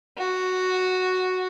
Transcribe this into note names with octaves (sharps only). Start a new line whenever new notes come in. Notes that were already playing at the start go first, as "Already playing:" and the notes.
F#4